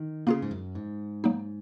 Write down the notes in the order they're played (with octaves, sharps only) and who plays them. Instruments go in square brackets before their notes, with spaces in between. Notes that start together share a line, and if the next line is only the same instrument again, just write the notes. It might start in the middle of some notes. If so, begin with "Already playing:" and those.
Already playing: [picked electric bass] D#3
[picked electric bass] C#3 [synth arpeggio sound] A#3 F4 G#4
[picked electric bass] G#2
F#2
G#2
[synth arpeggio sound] F#3 A#3 D#4